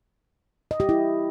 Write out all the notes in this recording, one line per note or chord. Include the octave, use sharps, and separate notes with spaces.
D#5
G4
E4